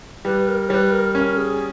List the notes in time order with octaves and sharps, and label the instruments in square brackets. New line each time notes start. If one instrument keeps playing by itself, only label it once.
[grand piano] G3 [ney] B4
[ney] A#4
[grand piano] G3 [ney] B4 C#5
[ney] A#4
[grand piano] C#4 [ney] A#4
[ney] G#4